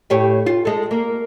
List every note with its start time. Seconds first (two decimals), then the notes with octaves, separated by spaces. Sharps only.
0.10 A2 G4 C#5
0.46 F4
0.65 G#3 A4
0.91 A#3